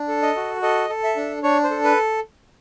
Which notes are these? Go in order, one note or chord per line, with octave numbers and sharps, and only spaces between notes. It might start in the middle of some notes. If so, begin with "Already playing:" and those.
Already playing: D4
A4
D#5
F#4
A4 D#5
A4
E5
D4
D4 C#5
C5
A4
B4